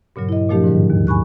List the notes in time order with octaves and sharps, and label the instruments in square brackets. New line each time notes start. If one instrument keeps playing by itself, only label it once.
[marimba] G2 A#2 C#3 F#3
E4 D#5
A#2 F3 A3 D4 G4
G#2 D3 D#3 G3
D#2
G#5 B5 C#6 F#6